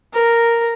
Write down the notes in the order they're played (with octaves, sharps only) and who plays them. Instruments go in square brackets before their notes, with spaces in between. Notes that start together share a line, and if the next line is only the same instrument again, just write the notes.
[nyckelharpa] A#4